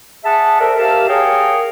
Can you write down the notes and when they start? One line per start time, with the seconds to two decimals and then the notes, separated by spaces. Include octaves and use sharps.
0.24 G#4 E5 F#5 A5
0.60 A4 A#4 C5 D5 E5
0.79 G4 A#4 E5 F5 A5
1.08 G#4 A#4 C#5 F5 G5